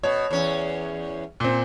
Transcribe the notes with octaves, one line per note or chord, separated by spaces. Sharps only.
B2 C#5
E2 C#4
A#2 C4